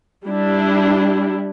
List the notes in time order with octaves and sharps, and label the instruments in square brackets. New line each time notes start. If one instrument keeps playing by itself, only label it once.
[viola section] G3 D4 E4